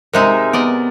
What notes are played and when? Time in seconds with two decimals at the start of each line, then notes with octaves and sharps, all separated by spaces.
0.13 C3 G#3 D#4 A#4 C5 E5
0.53 B3 A#4 D5 D#5